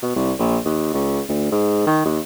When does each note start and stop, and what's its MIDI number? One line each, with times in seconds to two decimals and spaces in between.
0.02 0.15 47
0.16 0.32 36
0.39 0.58 34
0.65 0.92 39
0.94 1.21 37
1.29 1.51 38
1.52 1.84 44
1.87 2.02 51
2.05 2.19 39